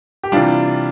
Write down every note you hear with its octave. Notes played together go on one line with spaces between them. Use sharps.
G4
C3 E3 G3 D4 F4